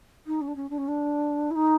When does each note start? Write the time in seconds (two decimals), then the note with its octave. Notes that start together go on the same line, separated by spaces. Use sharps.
0.26 D#4
0.41 C#4
0.47 D4
0.56 C#4
0.70 D4
0.77 C#4
0.88 D4
1.50 E4
1.55 D#4